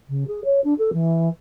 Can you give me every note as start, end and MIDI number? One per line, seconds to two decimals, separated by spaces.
0.09 0.24 49
0.27 0.43 68
0.44 0.60 73
0.64 0.74 62
0.78 0.90 69
0.93 1.29 52